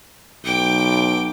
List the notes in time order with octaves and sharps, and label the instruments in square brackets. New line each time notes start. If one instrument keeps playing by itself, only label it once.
[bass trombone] B1 [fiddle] G5 D6